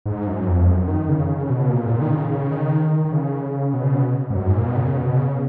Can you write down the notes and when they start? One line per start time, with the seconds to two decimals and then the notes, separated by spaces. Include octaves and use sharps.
0.06 G#2
0.27 F#2
0.47 F2
0.68 F#2
0.88 D#3
1.09 C#3
1.28 C#3
1.50 B2
1.69 A#2
1.86 G#2
1.90 A#2
2.01 D#3
2.10 C#3
2.31 C#3
2.51 D#3
3.05 D#3
3.12 C#3
3.74 B2
3.84 C#3
3.94 B2
4.30 G#2
4.35 F#2
4.47 G#2
4.55 A#2
4.66 B2
4.76 C#3
4.97 B2
5.17 C#3